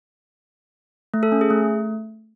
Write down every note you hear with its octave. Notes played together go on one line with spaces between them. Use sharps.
A3
A4
C#4
G#4
A3